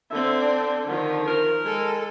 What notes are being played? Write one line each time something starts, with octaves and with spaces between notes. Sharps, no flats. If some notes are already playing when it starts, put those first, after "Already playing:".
D3 C4 E5
D4
D3 D#3 F3
A#4
G#3 A4